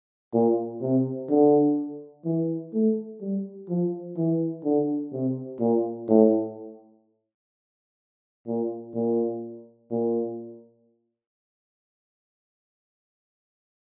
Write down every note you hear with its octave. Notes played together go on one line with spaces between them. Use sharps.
A#2
C3
D3
E3
A3
G3
F3
E3
D3
C3
A#2
A2
A#2
A#2
A#2